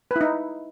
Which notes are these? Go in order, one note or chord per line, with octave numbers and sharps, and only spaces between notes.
D#4 E4 B4